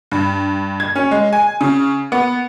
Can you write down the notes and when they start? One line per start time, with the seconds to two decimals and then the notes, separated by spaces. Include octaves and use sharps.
0.12 G2
0.80 G#6
0.95 C#4
1.11 G#3
1.33 G#5
1.61 C#3
2.12 B3